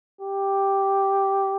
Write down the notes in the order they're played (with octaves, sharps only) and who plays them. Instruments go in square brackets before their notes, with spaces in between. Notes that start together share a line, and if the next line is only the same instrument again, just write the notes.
[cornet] G4